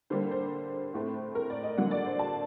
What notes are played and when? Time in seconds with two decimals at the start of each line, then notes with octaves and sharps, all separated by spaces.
0.10 D3 G3 A#3 C5
0.31 C5
0.94 A2 A3 C4
1.35 A#4
1.50 D5
1.63 D#5
1.78 D3 F#3 A#3 F#5
1.91 D5
2.06 C5
2.19 A5